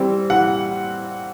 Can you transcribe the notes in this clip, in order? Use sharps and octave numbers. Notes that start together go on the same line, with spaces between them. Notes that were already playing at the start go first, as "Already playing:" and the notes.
Already playing: E3 G3 C4
E3 F#5